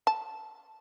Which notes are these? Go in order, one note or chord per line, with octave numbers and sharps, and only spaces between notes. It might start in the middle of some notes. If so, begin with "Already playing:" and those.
A5